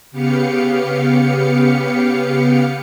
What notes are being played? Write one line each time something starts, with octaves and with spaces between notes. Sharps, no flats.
C#3 B3 G4 F5 C#7